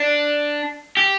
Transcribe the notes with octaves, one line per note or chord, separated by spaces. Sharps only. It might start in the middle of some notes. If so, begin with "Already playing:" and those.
Already playing: D4
G4